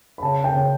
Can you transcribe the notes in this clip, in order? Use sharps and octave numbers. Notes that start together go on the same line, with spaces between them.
B5
C#3 A5
G5
C#3